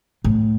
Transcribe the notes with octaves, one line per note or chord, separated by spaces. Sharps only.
A2